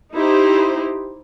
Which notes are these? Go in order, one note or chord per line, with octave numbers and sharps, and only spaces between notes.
D#4 E4 G4 C5